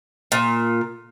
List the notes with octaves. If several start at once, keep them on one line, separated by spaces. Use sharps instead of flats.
A#2